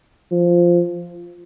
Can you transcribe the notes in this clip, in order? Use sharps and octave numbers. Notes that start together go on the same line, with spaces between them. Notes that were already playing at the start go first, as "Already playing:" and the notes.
F3